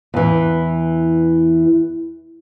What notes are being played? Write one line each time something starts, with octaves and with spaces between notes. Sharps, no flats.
E2 E3